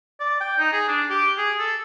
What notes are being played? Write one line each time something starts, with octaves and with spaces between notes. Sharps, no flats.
D5
G5
D#4
G#4
D4
G4
G#4
A4